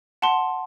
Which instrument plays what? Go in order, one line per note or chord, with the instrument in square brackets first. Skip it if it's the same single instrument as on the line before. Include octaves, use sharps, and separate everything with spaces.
[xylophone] F#5 A5 C6